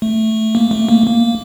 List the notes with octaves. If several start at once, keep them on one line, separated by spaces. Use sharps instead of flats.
A3
A#3
A3
A#3
A#3